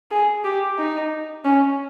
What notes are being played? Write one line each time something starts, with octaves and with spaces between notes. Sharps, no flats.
G#4
G4
D#4
C#4